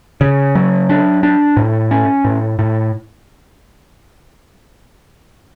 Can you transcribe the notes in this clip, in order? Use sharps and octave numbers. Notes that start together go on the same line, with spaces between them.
C#3
F#3
D4
D4
A2
C#4
A2
A2